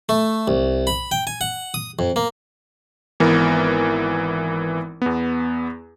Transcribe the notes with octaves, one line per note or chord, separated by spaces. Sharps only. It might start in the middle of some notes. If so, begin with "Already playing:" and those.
A3
C2
B5
G5
G#5
F#5
D#6
F2
A#3
G#1 E3 B3 A#4
E2 B3